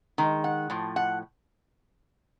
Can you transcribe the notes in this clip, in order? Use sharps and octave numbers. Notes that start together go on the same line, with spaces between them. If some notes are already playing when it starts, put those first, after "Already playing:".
D#3 G#3
F#5
A2 F3
F#5